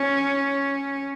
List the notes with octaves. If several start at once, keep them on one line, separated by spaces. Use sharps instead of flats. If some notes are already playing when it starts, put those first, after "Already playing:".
Already playing: C#4